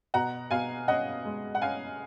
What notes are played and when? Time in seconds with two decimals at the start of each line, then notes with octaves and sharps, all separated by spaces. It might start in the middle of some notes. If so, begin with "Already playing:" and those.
0.14 B2 F#5 A#5
0.51 B2 F5 G#5
0.88 C#4 D#5 F#5
1.25 G#3
1.55 F#5
1.62 C#4 F5 G#5